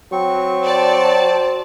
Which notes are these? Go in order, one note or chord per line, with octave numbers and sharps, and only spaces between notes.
F#3 C4 C#6
C5 D5 A5